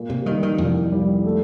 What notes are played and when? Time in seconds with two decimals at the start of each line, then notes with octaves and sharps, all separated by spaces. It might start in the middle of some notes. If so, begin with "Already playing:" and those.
Already playing: A#2 A#3
0.10 C3
0.26 D#3 G3
0.43 D#3
0.58 C2 F2
0.92 G3
1.24 A3